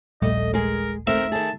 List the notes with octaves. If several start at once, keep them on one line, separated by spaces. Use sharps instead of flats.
D#1 A#1 G3 A3 D#5
G#3 G#4 A#4
D#3 A3 C4 A#4 E5
D#3 G#4 A5